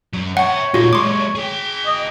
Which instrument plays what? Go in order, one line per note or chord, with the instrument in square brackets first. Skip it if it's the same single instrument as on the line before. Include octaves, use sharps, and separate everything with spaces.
[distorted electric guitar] F#2 F#3
[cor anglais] C#5 [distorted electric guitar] E5 G5 [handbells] F#5
[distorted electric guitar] A#2 D#4 [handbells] F4 F#4
[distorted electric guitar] F#3 G#3 [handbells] C6 D6
[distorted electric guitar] G#4 G5
[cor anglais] D#5